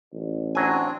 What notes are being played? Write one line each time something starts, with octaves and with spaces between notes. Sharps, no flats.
A1
F#3 C4 D4 G#5